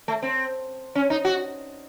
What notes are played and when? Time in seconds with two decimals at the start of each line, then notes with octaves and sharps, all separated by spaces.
0.08 A3
0.22 C4
0.95 C#4
1.10 D#4
1.25 F#4